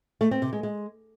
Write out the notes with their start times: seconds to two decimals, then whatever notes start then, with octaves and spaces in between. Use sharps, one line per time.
0.21 A3
0.31 C4
0.42 C3
0.53 G#3
0.63 G#3